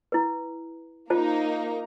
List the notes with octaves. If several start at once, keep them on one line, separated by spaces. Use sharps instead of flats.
E4 B4
A#3 D#4 F4 C5 A5 A#5